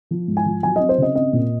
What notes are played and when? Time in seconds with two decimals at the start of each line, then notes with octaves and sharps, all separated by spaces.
0.11 F3
0.28 G#2
0.37 G#5
0.46 F3
0.63 F#3 G#5
0.76 C4 D#5
0.89 C5
0.98 C#3 D#5
1.15 C4 D#5
1.33 A#2